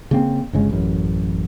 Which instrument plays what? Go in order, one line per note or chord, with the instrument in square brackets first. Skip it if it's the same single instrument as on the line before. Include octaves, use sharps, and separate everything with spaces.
[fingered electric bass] C#3 A#3 C4
G1 C#3 G#3
A1 F#2